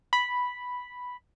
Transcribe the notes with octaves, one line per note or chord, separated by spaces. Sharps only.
B5